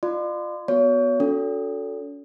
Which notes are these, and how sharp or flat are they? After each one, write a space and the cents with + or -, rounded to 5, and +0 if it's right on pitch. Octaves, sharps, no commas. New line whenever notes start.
F4 +0 D5 +40 C6 -25
B3 +0 F#4 +0 C#5 +35
C#4 +45 F#4 -25 A4 +0